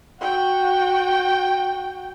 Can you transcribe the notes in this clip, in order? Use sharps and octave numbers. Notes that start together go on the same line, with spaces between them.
F#4 G5